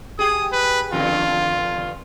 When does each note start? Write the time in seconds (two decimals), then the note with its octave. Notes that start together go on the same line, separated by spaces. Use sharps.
0.19 G4 G#4 D#6
0.52 B4
0.92 E2 G2 D3 F4